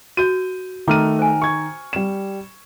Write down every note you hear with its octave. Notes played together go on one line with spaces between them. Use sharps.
F#4 G6 D#7
D#3 A3 A#5 D6 F6 D#7
C5 G#5
C#6 G#6
G3 E7